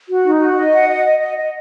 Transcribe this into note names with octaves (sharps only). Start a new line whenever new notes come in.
F#4
D#4
F#4
D#5
F#5
D#5
D#5
D#5
D#5